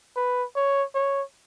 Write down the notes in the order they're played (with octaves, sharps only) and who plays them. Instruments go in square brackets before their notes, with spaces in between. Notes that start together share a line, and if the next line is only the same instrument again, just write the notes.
[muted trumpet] B4
C#5
C#5